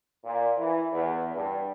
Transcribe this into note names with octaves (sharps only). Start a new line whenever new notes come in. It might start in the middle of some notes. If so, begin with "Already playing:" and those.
A#2
E3
E2
G2